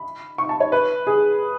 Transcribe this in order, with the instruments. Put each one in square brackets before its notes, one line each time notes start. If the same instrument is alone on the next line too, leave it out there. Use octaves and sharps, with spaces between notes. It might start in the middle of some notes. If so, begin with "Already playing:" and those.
Already playing: [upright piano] B5
C#6
A5
C#5
B4
G#4